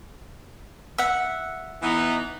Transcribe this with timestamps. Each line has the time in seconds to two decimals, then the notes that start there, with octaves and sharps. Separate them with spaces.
0.98 E5 F#5
1.82 E3 B3 D#4